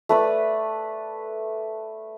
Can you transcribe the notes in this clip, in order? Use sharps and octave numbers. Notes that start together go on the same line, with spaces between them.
A3 B4 D5